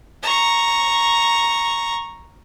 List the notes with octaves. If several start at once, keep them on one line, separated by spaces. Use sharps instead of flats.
A#5 C#6